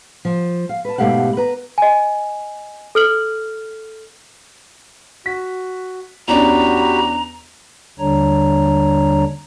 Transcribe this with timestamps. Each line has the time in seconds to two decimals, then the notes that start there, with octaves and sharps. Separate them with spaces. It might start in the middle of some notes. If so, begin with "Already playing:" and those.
0.25 F3
0.69 F5
0.85 B4 A5
0.98 G#2 B2 A3 G4 F5 F#5
1.37 B4 A#5
1.78 D#5 G#5
2.95 A4 F6 F#7
5.26 F#4 B6
6.28 E2 C#4 D4 F#4 G4 A#5 B5
7.99 D#2 D3 G3 D4 C#5 A#5